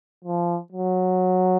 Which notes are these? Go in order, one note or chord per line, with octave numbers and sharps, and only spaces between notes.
F3
F#3